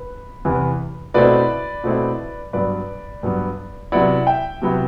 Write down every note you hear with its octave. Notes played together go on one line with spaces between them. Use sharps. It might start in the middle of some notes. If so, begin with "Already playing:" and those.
Already playing: B4
E2 C3 E3 B3
B2 A3 C4 E4 B4 D5
B2 A3 C4 E4
G2 F#3 B3 B4 D5
G2 F#3 B3
C3 F#3 B3 E4 D5 F#5
E5 G5
C3 F#3 B3 E4